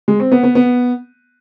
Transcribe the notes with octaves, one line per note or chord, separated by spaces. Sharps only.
G#3
C4
B3
B3
B3